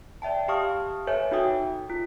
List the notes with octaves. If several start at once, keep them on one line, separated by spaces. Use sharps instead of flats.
D5 E5 G5 A5
G4 F5 A5 C#6 D#6 F6
A4 B4 C#5 E5 G#5 G6
D#4 F#4 A4 E5 G5 D#6
F4